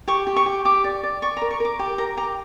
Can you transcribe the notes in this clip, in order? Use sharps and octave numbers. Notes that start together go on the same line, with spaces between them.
G4 C#6
G4
C#6
G4
G4 D6
D5
D5
D5 C#6
A#5
A#4
C#6
A#4 D6
G4
A#4 A#5
G4 A#5